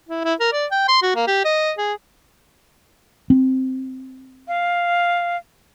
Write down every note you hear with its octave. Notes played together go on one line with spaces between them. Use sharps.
E4
E4
A#4
D5
G5
C6
F#4
A#3
G4
D#5
G#4
C4
F5